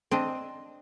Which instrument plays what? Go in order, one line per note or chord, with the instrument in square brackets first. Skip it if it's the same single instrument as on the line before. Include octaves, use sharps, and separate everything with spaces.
[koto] C4 D4 D#5